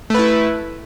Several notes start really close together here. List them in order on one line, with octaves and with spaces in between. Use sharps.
A3 B4 E4